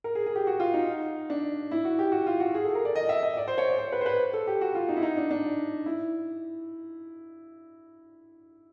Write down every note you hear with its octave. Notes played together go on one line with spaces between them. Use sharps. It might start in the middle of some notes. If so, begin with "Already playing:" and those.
A#4
G#4
G#4
G4
F#4
F4
D#4
D4
E4
F#4
G4
F#4
F4
F#4
G#4
A4
A#4
D5
D#5
E5
D#5
D5
C5
C#5
D5
C5
B4
C5
B4
A4
G4
F#4
F4
D#4
E4
D#4
D4
D4
E4